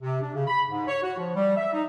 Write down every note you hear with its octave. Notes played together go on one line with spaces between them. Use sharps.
C3
D4
C#3
B5
G#2
C#5
F#4
F3
G3
E5
D#4